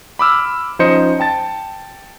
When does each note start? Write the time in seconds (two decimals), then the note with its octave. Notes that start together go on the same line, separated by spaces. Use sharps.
0.19 B5 D6 E6 F6
0.79 F3 C#4 D#4 C5 D#5 C#7
1.20 G5 A5 A6